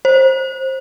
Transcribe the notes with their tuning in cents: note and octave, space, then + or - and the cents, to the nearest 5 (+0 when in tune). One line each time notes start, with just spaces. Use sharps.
C5 +20